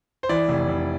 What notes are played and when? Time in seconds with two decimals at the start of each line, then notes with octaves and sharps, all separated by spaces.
0.23 C5
0.29 E3 D5
0.49 F1
0.68 F1